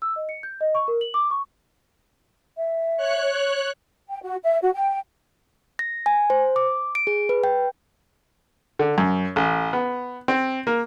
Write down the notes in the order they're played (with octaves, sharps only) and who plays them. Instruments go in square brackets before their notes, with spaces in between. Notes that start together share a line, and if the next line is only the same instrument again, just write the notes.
[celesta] E6
D#5
C#7
G6
D#5
C#6
A#4
F#7
D6
C#6
[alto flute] E5
[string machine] C#5 F#6
[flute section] G5
F#4
E5
F#4
G5
[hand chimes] A#6
G#5
C5
D6
D7
G#4
B4
G5
[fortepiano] D3
F#2
A1
B3
C4
A#3